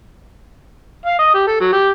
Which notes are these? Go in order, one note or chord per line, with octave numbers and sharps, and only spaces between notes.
F5
D#5
G4
A4
F#3
G4